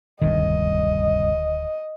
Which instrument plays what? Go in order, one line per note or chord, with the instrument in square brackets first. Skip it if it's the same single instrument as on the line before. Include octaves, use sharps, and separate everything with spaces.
[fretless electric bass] D1 D#3 [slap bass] G1 C2 G2 [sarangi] D#5